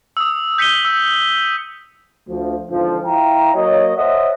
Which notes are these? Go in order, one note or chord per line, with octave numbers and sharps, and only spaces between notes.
D#6 E6
G6 B6 C#7 D#7 G7
E6
D2 F3
E2 G#2 D3 F3
E4 F5 G5 A#5
F#3 A#3 C#5 D#5
A4 C5 C#5 D#5 E5 F#5